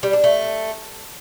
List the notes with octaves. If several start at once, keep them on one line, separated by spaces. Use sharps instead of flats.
G3
D4
A3